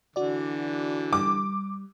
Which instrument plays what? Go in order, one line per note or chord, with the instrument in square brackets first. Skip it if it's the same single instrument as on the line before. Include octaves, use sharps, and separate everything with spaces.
[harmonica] D3 E3 [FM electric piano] F#4 D5
[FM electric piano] G3 [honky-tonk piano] D6